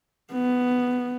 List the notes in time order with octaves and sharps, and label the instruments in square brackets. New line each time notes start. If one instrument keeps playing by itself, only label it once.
[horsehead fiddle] B3